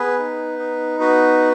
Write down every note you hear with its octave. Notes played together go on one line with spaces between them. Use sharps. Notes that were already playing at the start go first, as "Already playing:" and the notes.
Already playing: B3 G#4 B4
D#4
D#4
B3 F#4 B4